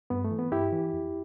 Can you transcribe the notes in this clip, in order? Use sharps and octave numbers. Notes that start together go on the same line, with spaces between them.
G2 B3
A3
E3
B3
G2 E4 G4
E3
F2